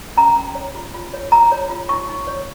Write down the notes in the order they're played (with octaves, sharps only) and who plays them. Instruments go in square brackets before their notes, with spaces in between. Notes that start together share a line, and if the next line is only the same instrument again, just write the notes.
[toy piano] C#4 A#5
C#4
C#5
F4
F4
C#5
F4 A#5
C#5
F4
D#4 C#6
D#4
C#5